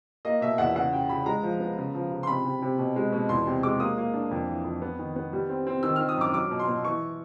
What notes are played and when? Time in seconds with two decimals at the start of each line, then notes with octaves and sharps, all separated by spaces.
0.25 A#3 D#5
0.41 B2 E5
0.58 E2 F#5
0.75 C#3 F#5
0.93 C#3 G5
1.09 C#3 B5
1.26 G#3 A#5
1.43 F3
1.60 B3
1.78 C#3
1.95 F3
2.11 C#3
2.23 C6
2.27 C3 B5
2.45 C3
2.62 C3
2.78 B2
2.96 G#3
3.12 B2
3.29 E2 C6
3.47 C3
3.63 G#3 D6
3.80 A#3 D#6
3.98 A#3
4.14 D4
4.31 F2
4.48 E3
4.64 F2
4.82 B3
4.99 D#3
5.16 B3
5.33 G3
5.49 C4
5.67 C4
5.83 D#3 E6
5.96 D#3 F6
6.09 D#6
6.17 F#2 D6
6.34 F#3 D6
6.51 B2
6.59 C6
6.68 B2
6.85 E3 C#6